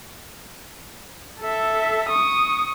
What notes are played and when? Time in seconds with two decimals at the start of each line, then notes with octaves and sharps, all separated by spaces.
1.41 A4 E5
2.09 C#6 D#6